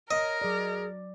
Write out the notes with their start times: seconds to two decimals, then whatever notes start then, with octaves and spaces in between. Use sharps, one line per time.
0.11 A#4 C#5 D#5
0.41 F#3 G#4 D5